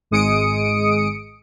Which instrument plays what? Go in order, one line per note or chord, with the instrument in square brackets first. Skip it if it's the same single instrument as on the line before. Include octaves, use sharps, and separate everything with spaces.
[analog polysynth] G#1 G#3 D#6 C#7 D7